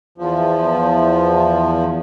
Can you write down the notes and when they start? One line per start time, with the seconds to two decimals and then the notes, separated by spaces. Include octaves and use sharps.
0.18 E2 F3